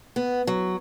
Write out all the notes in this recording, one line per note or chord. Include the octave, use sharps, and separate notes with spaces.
B3
F#3